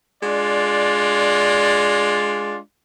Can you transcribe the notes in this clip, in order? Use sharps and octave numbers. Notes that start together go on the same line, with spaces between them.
G#3 D4 F4 D5